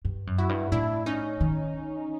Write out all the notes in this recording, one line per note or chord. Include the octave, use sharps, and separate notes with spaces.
G2
F#2
E4 F#4
G2
A2 D4 E4
C#4 D#4
D#3